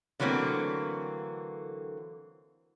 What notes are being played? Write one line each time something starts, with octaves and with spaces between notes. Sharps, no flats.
D3 E3 F#3 A3 A#3 C4